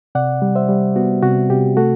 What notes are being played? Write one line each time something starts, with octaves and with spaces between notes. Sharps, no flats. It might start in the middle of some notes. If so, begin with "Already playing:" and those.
C3 D5 F#5
G3
C5 E5
G3
B3 F#4
C3 F#4
C3 G4
A3 F#4 A4